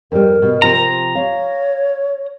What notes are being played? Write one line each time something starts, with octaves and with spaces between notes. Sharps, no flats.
F2 G3 A#4
B2
C3 F3 A#5
C#5 F5